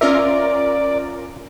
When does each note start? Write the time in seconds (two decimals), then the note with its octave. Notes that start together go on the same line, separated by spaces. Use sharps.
0.01 C#4 F4 A#4 D5 E5